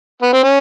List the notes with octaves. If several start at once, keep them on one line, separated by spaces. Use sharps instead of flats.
B3
C4
C#4